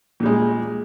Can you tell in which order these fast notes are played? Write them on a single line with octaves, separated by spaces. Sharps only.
A#2 G3 G#3